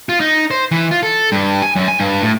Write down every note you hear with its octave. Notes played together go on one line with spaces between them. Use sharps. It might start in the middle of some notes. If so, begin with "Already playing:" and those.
F4
D#4
C5
E3
F4
A4
G2
G#5
F#2
G#5
G2
A2